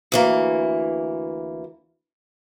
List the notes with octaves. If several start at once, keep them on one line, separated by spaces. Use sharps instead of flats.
D2 E3 A#3